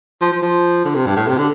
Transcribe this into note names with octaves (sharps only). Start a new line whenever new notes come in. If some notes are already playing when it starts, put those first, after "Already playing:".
F3
F3
F3
D3
C3
G2
A2
C3
D3